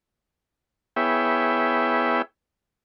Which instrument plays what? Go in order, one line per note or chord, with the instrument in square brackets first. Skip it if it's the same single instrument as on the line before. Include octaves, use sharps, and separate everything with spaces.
[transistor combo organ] B3 E4 G#4 C#5 E5 G5